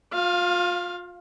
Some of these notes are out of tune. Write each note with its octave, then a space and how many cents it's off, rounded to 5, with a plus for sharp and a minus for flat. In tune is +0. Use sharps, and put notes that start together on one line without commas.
F4 +30 F5 +0